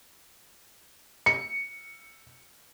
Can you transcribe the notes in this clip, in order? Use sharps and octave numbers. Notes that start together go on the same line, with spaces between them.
C#7